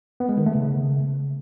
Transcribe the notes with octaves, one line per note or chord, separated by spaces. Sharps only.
B3
G#3
D#3
A3
C#3